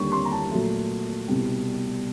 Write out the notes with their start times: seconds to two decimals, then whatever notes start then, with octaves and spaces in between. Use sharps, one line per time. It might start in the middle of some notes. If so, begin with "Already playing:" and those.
Already playing: D#2 D3 G3 C#6
0.12 C6
0.25 A#5
0.31 A5
0.51 A#2 F#3 A3
1.28 C2 B2 G3